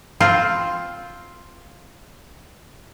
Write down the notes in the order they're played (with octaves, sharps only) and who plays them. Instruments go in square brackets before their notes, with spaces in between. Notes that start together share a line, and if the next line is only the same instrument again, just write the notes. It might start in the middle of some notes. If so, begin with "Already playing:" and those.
[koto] C4 F4